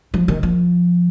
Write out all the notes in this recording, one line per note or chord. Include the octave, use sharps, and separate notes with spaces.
F3
D#3
F3